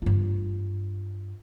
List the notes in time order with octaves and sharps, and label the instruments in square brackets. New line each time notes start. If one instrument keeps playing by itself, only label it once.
[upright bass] G2 F4